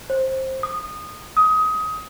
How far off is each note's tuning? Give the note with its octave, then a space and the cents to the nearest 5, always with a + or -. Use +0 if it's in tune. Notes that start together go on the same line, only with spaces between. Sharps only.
C5 +15
D#6 -20
D#6 +20